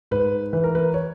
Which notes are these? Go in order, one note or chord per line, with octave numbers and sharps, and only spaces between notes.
G#2 B4
E3 B4
A#4
B4
C#5